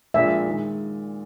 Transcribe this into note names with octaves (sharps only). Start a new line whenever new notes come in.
A#1 A#2 F3 G#3 E5
D#3 G#3